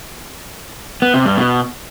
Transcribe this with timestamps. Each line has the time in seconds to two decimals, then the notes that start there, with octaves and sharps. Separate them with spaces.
1.02 B3
1.14 C3
1.26 G2
1.37 B2